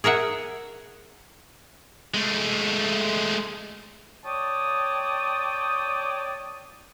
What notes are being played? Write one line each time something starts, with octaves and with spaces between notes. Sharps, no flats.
G#4 A#4 E5 F#5
G#3 A3
C#5 D5 G5 A5 D#6